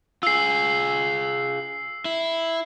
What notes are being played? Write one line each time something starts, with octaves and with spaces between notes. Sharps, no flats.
F4 G#4 E6 C7
E4